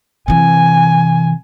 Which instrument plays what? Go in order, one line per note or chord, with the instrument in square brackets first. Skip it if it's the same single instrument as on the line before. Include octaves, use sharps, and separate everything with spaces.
[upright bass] C3 E3 [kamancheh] G#5